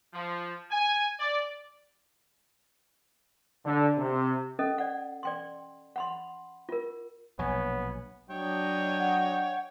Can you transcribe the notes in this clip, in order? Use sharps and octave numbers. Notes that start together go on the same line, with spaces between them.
F3
G#5
D5
D3
C3
C#4 A4 D#5
D5 F#5
D5 G5 C6
F#5 B5 C6
F4 A#4
A#1 B2 F#3 B3 C#5 G#5
F#3 D4 C#5 D#5 G5
F#5